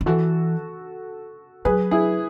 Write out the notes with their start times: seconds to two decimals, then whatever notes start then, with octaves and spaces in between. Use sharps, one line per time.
0.01 D#3
0.06 E3 F#4 A4
1.65 F#3 G#4 B4
1.91 E4 G#4